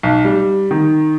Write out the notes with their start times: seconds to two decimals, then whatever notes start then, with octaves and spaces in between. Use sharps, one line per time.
0.03 B1
0.25 G3
0.71 D#3